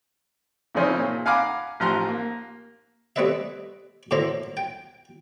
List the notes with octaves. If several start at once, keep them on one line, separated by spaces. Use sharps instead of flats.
E2 C#3 F3 C4 C#4 D#4
A#2
F5 F#5 G#5 A#5 B5 D6
A1 F3 A#5 C6 F#6
A#3
G3 A3 C4 B4 D#5 E5
F#2 A2 D3 C5 E5 A#5
G5